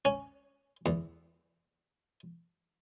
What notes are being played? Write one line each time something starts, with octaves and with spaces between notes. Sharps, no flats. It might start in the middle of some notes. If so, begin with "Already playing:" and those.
C#4
E2